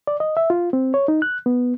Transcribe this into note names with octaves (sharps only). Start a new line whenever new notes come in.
D5
D#5
E5
F4
C4
C#5
D#4
F#6
B3